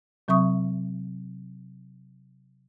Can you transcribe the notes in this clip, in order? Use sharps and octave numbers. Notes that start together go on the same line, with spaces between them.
C3 F#3 C4 E5 C#6 D#6